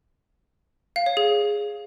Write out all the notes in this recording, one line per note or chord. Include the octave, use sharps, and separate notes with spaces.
F5
C#5
G#4